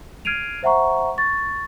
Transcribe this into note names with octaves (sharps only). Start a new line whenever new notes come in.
F6 G#6 C7 D7 D#7 F7
C5 E5 F#5 A#5 C#6
C#6 A6